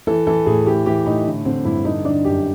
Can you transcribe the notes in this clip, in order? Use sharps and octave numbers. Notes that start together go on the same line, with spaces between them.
E3 A4
E3 A4
A2 G#4
E3 G4
E3 G4
A2 D#4
D3
D3 C4
G2 E4
D3 D#4
D3 D4
F#2 G4